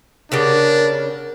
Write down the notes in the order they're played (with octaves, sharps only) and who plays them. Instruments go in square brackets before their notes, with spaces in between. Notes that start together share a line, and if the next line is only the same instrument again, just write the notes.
[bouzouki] C#3 B3 G4 [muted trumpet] D4 [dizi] A#4